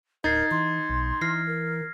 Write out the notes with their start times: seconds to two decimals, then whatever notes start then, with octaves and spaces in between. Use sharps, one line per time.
0.24 D1 D#4 A#4 G#6 A6 C7
0.51 E3 C6
0.89 B1
1.21 E3 F6 A#6 C7
1.47 A#4